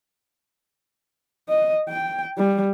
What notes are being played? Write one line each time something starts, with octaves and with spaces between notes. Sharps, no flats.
D#5
G5
G3